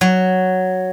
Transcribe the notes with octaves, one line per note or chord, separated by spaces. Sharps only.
F#3